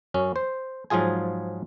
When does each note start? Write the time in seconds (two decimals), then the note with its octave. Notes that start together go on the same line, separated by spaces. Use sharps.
0.14 F#2 C#4
0.36 C5
0.90 G#2 F3 F#3 F4 G#4 G#5